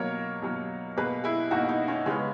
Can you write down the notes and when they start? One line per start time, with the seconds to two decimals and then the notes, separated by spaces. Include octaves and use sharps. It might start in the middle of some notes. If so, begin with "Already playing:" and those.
Already playing: B2 F#3 A#3 A#4 C#5
0.42 B2 F#3 A#3
0.97 B2 A#3 G#4 B4
1.24 E4 G#4
1.51 B2 A#3 D#4 F#4
1.69 D#4
1.88 C#4
2.06 C#3 G#3 B3 C#4